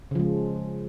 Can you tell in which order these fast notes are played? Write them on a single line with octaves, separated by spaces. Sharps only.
C#3 F3 G#3